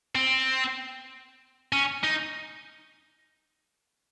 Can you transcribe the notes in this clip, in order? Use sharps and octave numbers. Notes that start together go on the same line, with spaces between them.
C4
C#4
D#4